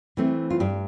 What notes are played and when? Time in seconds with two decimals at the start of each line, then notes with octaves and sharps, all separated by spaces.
0.17 E3 A3 C4
0.50 F4
0.60 G2 G4